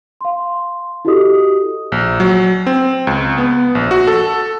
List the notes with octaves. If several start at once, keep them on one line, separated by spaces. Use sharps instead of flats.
F5 C6
E4 F#4 G4 A4 D#5 D#6
A#1
F#3
C4
C#2
B3
A#1
F#4
A4